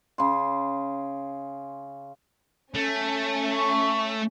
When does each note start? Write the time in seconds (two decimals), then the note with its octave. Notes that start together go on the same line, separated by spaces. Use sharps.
0.18 C#3 C6
2.75 A3 C#4
3.55 C#6